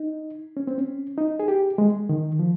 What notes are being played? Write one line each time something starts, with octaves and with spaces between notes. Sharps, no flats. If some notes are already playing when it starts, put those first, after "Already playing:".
Already playing: D#4
C#4
C4
C#4
D#4
G#4
G4
G#3
D#3
F3